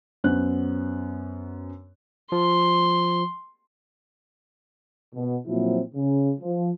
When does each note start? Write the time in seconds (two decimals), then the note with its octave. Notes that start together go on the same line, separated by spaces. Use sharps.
0.24 F#2 B3 C5 F#6
2.32 F3 C6
5.15 B2
5.47 A#2 F3 F#3 C4 E4 F#4
5.94 C#3
6.40 F3